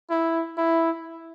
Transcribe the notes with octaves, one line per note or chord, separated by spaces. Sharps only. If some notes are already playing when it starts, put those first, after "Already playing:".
E4
E4